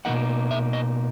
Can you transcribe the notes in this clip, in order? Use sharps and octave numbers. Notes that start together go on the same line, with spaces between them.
B2 G3 A#3 D#4 F#5
E5
D#5